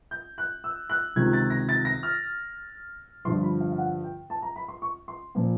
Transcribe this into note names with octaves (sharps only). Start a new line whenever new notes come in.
G6
F#6
E6
F#6
C#2 C3 D#3 G#6
A6
A#6
A6
A#6
F6
G2 D3 F3 C6
B5
F5
F5
F#5
G5
A5
A#5
B5
C6
C#6
C6
A#2 F3